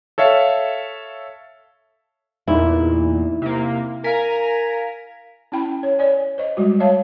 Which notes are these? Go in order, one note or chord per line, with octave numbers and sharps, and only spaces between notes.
A4 C#5 E5 F5
E2 A#2 D#4 E4
C3 A#3
A#4 F5 G#5 A#5 B6
C#4 E4 G5 B5
C#5
C#5 D5 G#5
C5 D#5
G3 G#3 F#4
C#5 E5 F5 A5